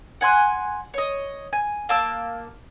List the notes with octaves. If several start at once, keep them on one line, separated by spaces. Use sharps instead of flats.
F#5 G#5 C6 F#6
C#5 D#5
G#5
A#3 A5 E6